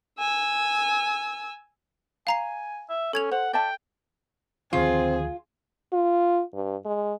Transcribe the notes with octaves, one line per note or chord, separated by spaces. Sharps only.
G#5 E6
F5 G#5 A#5 C7
E5
C#4 A4 G#6 F7
C5 F#5
D5 E5 G5 A5
D2 D#3 F3 C4 F4 G#4
F4
G2
G#3